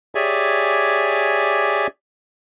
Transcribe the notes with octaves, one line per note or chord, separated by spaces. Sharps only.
G4 G#4 C#5 D5 E5 G#5